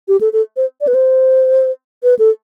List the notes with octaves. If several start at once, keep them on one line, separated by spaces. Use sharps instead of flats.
G4
A4
A4
C5
D5
B4
C5
B4
A4